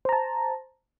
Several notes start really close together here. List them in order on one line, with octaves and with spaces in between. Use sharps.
C5 A#5 A5